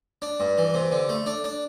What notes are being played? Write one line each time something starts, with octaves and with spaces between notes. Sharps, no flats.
D4
G2
E3
C3
D3
A3
D4
D4